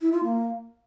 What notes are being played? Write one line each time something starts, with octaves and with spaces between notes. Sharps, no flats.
E4
F4
A#3